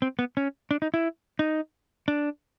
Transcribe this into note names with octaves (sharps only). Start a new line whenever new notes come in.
C4
B3
C#4
D4
D#4
E4
D#4
D4